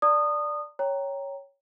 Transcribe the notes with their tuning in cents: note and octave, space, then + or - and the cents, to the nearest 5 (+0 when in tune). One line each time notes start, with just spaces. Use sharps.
D5 +0 A5 +45 D#6 -20
C#5 +0 G5 +0 A#5 +0